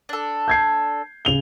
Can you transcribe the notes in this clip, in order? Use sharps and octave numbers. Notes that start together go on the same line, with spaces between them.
D4 A4
G6 G#6 C7
C#3 F7 G7